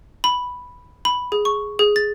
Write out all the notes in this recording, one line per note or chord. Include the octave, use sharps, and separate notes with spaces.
B5
B5
G#4
C#6
G#4
A6